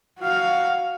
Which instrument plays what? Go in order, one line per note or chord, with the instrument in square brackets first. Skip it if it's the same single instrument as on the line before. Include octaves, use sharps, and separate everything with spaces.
[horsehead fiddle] F#4 F5